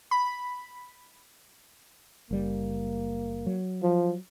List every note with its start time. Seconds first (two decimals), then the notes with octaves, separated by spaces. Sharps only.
0.11 B5
2.31 F#1 G3 A#3
3.47 F#3
3.83 F3